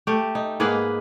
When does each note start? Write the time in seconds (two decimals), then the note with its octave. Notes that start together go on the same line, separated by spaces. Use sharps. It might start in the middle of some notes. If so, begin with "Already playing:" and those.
0.07 A3 G4
0.35 D#4
0.60 G#2 A#3 G#4 B4